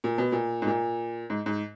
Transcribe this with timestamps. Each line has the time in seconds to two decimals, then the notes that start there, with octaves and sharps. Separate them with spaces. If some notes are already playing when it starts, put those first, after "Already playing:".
0.04 A#2
0.18 B2
0.32 A#2
0.62 G#2
0.67 A#2
1.30 G#2
1.46 G#2